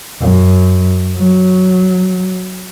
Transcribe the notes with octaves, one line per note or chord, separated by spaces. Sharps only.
F#2
F#3